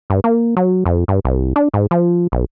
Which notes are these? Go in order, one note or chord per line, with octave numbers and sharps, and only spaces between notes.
G2
A#3
F#3
F2
G2
C2
D4
G#2
F3
B1